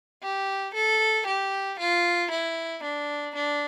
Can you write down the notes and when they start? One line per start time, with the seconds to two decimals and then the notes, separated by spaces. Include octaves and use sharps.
0.23 G4
0.74 A4
1.27 G4
1.80 F4
2.31 E4
2.83 D4
3.35 D4